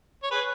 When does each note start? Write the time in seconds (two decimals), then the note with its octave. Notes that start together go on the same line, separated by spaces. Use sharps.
0.23 C#5
0.31 G#4 B4